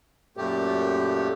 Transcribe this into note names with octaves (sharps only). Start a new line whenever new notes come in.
F#2 A#2 A3 G4